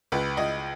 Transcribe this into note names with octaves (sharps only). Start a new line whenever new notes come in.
C#2 B4
C#2 D#5